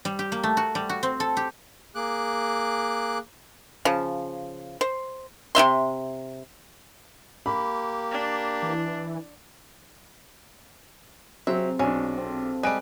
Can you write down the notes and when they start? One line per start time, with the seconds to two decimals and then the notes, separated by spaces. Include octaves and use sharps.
0.05 G3
0.19 G4
0.32 A#3
0.43 A3
0.57 F#4
0.75 G3
0.89 F#4
1.03 C4
1.20 A4
1.37 G4
1.95 A#3 G#4 D6 F#6
3.85 C#3 F3
4.81 C5
5.55 C3 D#4 E5 C6
7.46 A#3 G4 B5
8.12 D4
8.63 E3
11.47 C3 F#3 C4 F4 G#4 E5
11.79 B1 C#4 D4
12.17 C4 A4
12.63 G3 G#3 F#6 D7